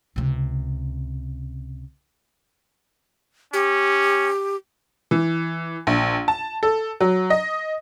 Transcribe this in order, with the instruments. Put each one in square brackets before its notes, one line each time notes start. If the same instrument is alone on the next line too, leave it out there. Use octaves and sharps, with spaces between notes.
[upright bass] C#2 C3
[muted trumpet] C#4 [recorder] G4
[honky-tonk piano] E3
A#1
A5
A4
F#3
D#5